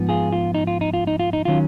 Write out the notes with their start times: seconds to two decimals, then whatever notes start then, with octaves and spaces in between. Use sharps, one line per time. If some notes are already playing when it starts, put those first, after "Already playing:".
Already playing: G#2 F3 B3
0.09 F4 G#4
0.32 F4
0.55 D#4
0.67 F4
0.81 D#4
0.94 F4
1.07 D#4
1.20 F4
1.33 D#4
1.45 D#3 F#3 C#4 F4